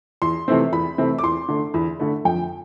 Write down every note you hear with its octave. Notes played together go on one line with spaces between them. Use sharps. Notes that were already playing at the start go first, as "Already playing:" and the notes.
E2 C6
C3 E3 A3 C4
E2 B5
C3 E3 A3 C4
D6
E2 C6
D3 A3
E2 B5
D3 A3
F2 G5